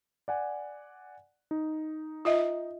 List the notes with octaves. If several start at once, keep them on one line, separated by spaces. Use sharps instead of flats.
D5 F#5 G#5
D#4
F4 D#5 E5